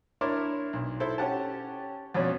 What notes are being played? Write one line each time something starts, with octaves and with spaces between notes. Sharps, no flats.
D4 E4 A#4 C#5 C6 D6
B1
E4 A4 C5
C#4 G4 F#5 A5
F2 B2 C#4 C#5 D5